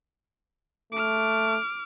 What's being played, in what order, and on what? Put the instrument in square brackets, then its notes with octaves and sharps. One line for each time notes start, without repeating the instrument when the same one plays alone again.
[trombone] A3 [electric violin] D6 F6